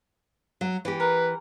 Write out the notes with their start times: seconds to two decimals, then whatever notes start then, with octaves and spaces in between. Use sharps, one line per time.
0.61 F#3
0.85 E3 G4
1.00 A#4 B4